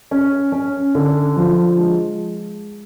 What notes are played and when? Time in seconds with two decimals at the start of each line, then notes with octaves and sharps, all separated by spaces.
0.11 C#4
0.52 C#4
0.95 D3
1.36 F3
1.78 G#3